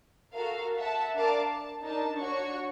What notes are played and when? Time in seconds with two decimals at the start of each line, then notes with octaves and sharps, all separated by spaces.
0.32 F#4 A4 A#4 F5
0.76 E5 F#5 A5
1.15 D4 A#4 D5 F5 A5 D6
1.49 A5
1.81 D4 D#4 A#4 A5
2.18 D4 F#4 C#5 C#6